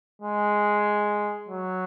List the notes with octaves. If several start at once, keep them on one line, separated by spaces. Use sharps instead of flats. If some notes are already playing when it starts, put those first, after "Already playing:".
G#3
F#3